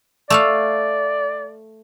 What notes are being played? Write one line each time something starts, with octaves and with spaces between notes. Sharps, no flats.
A3 A4 D5 F5